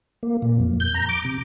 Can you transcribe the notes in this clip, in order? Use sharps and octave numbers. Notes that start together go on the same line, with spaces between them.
A#3
A#2
F2
G6
A#5
D6
C3